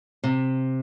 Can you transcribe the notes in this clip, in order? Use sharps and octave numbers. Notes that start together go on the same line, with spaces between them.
C3